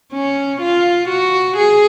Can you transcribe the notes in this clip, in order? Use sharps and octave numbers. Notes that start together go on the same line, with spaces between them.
C#4
F4
F#4
G#4